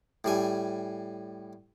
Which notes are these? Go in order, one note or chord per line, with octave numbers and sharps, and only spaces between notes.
A2 G3 G#5